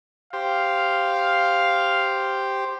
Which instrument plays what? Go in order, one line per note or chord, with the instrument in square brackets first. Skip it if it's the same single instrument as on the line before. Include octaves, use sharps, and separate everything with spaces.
[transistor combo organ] G4 C5 [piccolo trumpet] F5